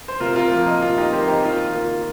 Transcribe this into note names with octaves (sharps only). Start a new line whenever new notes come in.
C5
C3 F4 A#4
F4 A#4
F3 A#3
A#4 D#5
C3 F4
D#4 G4
F3 A#3 G4 C5
D#4 G4
D#3 F4
A#3 F4